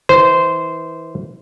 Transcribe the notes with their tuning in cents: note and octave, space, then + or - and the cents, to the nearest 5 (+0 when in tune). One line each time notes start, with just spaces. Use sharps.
E3 -25 C5 -15